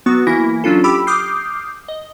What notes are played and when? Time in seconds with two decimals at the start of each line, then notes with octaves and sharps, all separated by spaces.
0.06 F#3 B3 F#4 C#6
0.27 E3 A#3 E4 A#6
0.64 F#3 C#4 D4 F4 A4
0.84 G4 B5 D6 E6
1.07 D6 D#6 F6 G6 C7
1.88 D#5